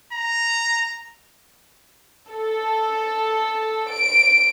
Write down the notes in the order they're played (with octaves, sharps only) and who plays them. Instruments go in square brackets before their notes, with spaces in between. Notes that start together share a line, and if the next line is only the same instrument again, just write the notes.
[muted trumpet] A#5
[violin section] A4
D7